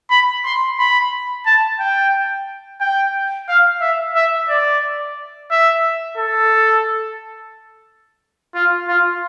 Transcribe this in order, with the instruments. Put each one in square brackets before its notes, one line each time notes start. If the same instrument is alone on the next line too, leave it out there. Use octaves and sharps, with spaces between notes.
[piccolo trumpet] B5
C6
B5
A5
G5
G5
F5
E5
E5
D5
E5
A4
F4
F4